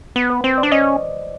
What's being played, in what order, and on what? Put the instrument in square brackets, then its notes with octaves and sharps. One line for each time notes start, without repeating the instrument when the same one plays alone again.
[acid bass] B3
[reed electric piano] B4
[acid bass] C4 [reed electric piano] C5
[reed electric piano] D5
[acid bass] D4
[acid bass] C#4 [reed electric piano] D#5